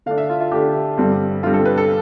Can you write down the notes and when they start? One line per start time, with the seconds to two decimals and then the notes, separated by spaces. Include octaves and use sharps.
0.06 D3 A3 D4 F5
0.18 E5
0.30 F4
0.40 F4
0.52 D3 A3 D4 G4
0.98 G2 D3 G3 C4
1.43 G2 D3 G3 C4 F4
1.54 A4
1.65 B4
1.77 A4